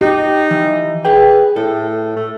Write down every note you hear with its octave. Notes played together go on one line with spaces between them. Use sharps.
D#4 G4
E3
G#4 B4 G5
A2 A4
A3